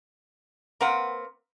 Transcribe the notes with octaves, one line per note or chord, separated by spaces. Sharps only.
A#3 C4 B4 F#5